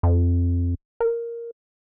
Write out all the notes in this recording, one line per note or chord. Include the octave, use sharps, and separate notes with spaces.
F2
A#4